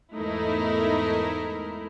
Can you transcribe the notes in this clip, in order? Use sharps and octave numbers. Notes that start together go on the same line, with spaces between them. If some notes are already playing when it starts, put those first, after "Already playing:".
E2 G#2 A3 D#4 E4 A#4